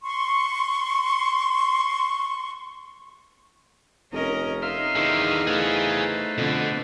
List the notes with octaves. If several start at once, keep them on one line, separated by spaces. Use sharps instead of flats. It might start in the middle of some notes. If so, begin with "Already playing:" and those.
C6 C#6
F1 C#4 A#4 D#5
D#4 E5 F5 C6
E2 D3 D#3
A3 G#4 B4 C5 F5
F2 B2 D3